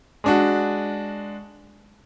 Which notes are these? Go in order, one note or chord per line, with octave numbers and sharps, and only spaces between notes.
G#3 D4 F#4